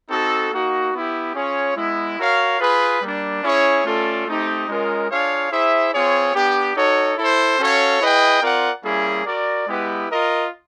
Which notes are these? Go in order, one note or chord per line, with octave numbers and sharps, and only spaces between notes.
C4 D#4 F#4 A4
A#3 D#4 F#4
B3 E4 G4
C#4 F4 G#4 C#5
G#3 B3 E4
F#4 A#4 C#5 F5
F4 G#4 B4
G3 A#3 D4
C#4 E4 G#4 C#5
A3 C#4 F4 A4 D5
A3 C4 D#4 G4
G#3 C#4 F4 A#4 D#5
D4 F4 G#4 C#5 F5
E4 G#4 C5 E5
C4 F4 G#4 C#5
B3 D4 G4
D#4 F#4 A4 C#5
E4 A4 C5
C#4 F#4 A4 C#5 F5
E4 G#4 B4 D#5 G5
C4 F4 A#4 D5 F#5
G3 A#3 C#4 E4 G#4
F#4 A#4 D5
G#3 B3 E4 G4 B4
F4 A#4 D#5